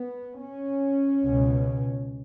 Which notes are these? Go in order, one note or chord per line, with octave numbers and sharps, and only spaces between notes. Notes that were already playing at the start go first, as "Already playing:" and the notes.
Already playing: B3
C#4
C#2 B2